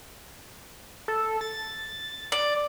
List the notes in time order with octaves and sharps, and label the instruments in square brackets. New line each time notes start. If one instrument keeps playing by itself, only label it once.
[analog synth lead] A4
A6
[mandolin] D5